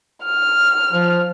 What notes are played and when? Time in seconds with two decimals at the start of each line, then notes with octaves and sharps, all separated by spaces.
0.25 F6
0.93 F3